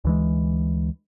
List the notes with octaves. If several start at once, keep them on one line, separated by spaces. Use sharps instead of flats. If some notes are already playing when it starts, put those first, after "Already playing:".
D2 E3 G#3